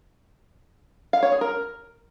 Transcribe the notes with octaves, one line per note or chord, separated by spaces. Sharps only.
F5
C#5
G#4
A#4